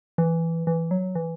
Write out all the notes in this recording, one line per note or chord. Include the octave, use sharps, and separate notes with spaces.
E3
E3
F#3
E3